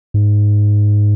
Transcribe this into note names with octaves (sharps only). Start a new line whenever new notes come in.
G#2